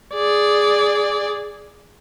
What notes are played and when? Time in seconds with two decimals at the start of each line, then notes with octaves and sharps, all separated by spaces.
0.15 G#4 D5